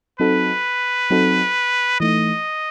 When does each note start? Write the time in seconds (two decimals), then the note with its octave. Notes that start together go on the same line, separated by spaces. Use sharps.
0.19 F#3 C4 D#4 F#4 A4 B4
1.10 F#3 C4 D#4 F#4 A4
2.00 E3 A3 D#4 D#5